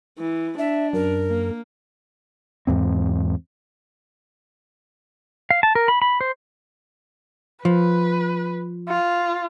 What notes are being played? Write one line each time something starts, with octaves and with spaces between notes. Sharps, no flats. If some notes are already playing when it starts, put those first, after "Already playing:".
E3
D4 E5
F#2 A#4
A#3
E2 G#2 C4
F5
A5
A#4
B5
B5
C5
F3 B4
F4